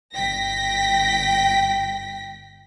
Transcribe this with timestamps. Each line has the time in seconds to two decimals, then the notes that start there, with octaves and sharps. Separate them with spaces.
0.13 G1 G5 A#6 B6